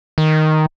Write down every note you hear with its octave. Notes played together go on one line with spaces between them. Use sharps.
D#3